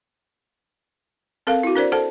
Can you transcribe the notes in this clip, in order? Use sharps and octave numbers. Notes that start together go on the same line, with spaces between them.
C4 A4 A#4 F5
E4 F#4
D4 A#4 C5 D5
A4 C5 F#5 A5